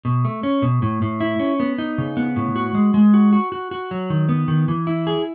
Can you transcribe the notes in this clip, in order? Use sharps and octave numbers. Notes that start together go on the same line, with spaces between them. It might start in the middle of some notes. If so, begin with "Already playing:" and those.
B2
A3
C#4
B2
A2
A2
E4
C#4
B3
D#4
C#3
B3
A2
F#4
G#3
G#3
F#4
F#4
F#4
F#4
F#3
D#3
B3
D#3
E3
E4
G#4